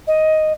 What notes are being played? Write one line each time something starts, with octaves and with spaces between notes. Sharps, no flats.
D#5